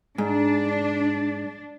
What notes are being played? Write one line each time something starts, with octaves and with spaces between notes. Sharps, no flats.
G#2 D4